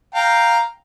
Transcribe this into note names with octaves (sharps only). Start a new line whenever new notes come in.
F5 G5 A#5